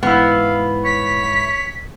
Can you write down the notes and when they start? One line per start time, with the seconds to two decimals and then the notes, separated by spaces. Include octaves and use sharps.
0.03 G#2 E3 B3 E4 F5
0.85 C#5 B6